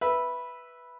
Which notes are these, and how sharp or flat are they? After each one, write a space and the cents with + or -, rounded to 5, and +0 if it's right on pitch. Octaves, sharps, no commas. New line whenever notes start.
B4 -5 E5 +0